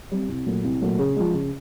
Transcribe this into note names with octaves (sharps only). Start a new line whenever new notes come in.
G3 C4
C2
A#2 F#3 A3
C2
A#2 F#3 A3
C#3
F3 G#3
C#3